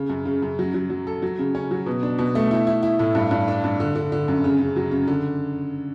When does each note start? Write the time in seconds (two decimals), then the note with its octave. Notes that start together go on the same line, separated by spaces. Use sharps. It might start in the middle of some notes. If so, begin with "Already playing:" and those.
Already playing: C#3
0.09 F#2
0.25 C#3
0.42 F#2
0.59 F#3
0.74 F#3
0.90 F#3
1.07 A4
1.22 F#3
1.39 C#3
1.55 C#4
1.71 F#3
1.86 B2
2.03 D4
2.18 B2
2.35 A3
2.51 E4
2.67 E4
2.83 E4
2.99 A2
3.15 G2
3.31 G2
3.48 D4
3.64 G2
3.80 D3
3.96 D3
4.12 D3
4.28 F#2
4.44 C#3
4.60 C#3
4.76 F#3
4.91 C#3
5.08 D3